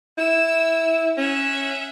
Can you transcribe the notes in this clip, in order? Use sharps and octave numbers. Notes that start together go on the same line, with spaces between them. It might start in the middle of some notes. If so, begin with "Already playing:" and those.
E4 E6
C#4 E5 F#5